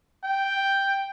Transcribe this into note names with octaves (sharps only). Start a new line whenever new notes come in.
G5